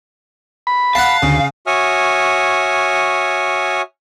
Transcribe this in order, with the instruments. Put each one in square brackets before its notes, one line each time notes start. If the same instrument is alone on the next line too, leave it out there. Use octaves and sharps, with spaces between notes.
[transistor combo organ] B5
[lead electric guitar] F5 [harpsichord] F#5 A5
[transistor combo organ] D2 [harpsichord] C#3
[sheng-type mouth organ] F#4 C#5 E5 G#5 D#6 F6